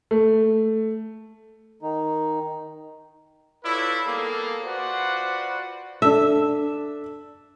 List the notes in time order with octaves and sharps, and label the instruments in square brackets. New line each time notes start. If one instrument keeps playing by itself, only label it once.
[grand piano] A3
[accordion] D#3 D#4
[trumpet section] E4 F4 A4 B4 C#5 D5
G3 A#3 B3 G#4 A4
F4 F#4 B4 C5 D5 F#5
[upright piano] D4 A4 [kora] E5